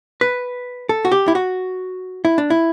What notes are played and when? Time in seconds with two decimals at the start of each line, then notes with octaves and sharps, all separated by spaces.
0.21 B4
0.89 A4
1.05 F#4
1.12 G4
1.28 E4
1.35 F#4
2.25 E4
2.38 D4
2.50 E4